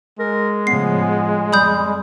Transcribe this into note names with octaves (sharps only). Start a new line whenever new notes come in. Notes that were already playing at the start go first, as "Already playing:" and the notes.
G#3 A#4
A2 C#3 F3 B3 C7
F2 G3 B5 D#6 G6